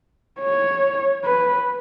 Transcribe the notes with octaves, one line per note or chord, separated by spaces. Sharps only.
C#5
B4